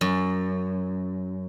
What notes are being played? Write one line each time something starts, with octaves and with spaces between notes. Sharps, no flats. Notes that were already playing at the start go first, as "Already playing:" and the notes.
F#2